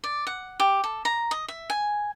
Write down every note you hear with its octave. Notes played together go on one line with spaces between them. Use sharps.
D5
F#5
G4
A4
A#5
D#5
E5
G#5